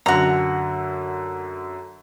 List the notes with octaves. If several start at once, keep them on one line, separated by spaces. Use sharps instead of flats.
F#2 D3 F#4 A#5